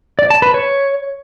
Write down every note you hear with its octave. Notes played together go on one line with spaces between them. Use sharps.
D5
A5
B4
C#5